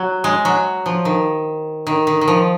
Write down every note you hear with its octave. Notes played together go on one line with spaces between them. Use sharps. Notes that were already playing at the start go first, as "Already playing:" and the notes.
Already playing: F#3
G#3
F#3
F3
D#3
D#3
D#3
D#3
F3